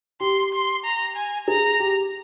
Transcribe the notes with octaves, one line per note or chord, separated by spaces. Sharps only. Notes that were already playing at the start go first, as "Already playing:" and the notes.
G4 C6
C6
A#5
G#5
G#4 A#5
G4